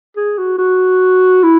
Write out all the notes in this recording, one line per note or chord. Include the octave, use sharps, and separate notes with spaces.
G#4
F#4
F#4
E4